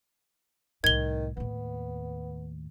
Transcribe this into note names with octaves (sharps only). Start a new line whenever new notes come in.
C2 A2 D#3 G#6 G7
D#2 A2 B3